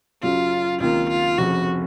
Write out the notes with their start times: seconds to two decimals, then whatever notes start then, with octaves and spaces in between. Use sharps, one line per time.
0.22 F#2 C#3 F#3 F4
0.80 C#2 C3 D#3 A#3 F4
1.09 F4
1.38 F1 F2 C#3 F#4